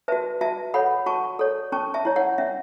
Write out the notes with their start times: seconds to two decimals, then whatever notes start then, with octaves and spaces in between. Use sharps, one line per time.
0.08 F#4 B4 E5 A5
0.41 F#4 E5 A5
0.74 A4 C#5 F#5 B5
1.06 F#4 A5 C#6
1.39 A4 C#5
1.72 C#4 A5 C#6
1.94 E5 A5
2.05 E4 C#5
2.16 C#5 F#5
2.38 C#4 E5